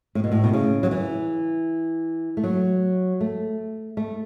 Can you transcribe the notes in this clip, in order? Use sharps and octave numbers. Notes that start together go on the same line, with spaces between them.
A2
B2
A2
B2
C#3
F#3
E3
A3
F#3
A3
A3